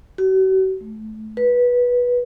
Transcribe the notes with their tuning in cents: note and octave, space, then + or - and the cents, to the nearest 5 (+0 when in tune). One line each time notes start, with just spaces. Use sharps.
F#4 +45
A3 -20
B4 -15